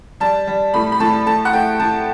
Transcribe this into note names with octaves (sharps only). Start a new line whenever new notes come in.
G3 A5
G3
A2 B5
B5
A2 A5
A3 A5
F#5
A3 G5
A2 A5